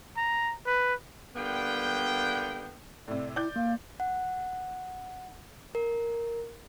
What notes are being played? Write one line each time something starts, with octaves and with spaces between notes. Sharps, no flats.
A#5
B4
D3 G3 A#3 B3 G5
A2 C3 D5
E4 D5 G6
A#3 F5
F#5
A#4